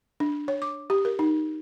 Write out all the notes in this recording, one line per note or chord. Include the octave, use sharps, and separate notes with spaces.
D4
C#5
D6
G4
A#4
D#4